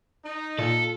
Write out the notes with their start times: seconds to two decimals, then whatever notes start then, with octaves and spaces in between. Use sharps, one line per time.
0.24 D#4
0.59 A#2 F4 A4